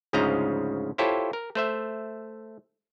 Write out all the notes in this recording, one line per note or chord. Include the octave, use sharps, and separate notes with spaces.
D2 G#2 C#3 F3 D#5 A#5
E4 F4 G4 A4 C5 C#5
A#4
A3 C5 E5